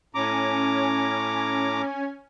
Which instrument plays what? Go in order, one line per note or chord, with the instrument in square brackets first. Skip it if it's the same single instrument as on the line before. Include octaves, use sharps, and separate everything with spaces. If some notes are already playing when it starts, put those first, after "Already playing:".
[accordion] A2 A#5 D6 [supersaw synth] C#4 G#5